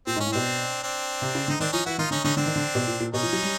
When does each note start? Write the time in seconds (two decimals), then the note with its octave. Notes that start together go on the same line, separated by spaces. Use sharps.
0.07 A#2 C4
0.16 G#2
0.20 C#4
0.27 A2
0.32 B2 C4 D4
0.83 C4 D4
1.22 C3
1.35 C#3
1.48 D3 D#4
1.60 D#3 C4 D4
1.72 F3 C#4 D#4
1.86 E3 E4 F#4
1.98 D#3 D#4 F4
2.11 D3 C#4 D#4
2.24 D3 C#4 D#4
2.36 D3 C4 D4
2.46 D#3
2.56 D3
2.75 B2
2.87 A#2
3.00 A#2
3.14 B2 C#4 D#4
3.23 F3
3.33 F#3
3.43 G3